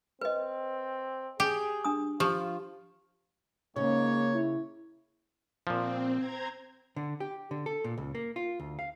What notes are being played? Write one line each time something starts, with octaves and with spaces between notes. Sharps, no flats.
C4 B4 D#5
G4 G#4
D4 D#6
F3 F4 G4
G#2 C#3 A#3 C#5
E4
A#2 F3 C4
C5 A#5 G#6
D3
G4
D3
A4
A#2
C#2
A#3
F4
D2
F5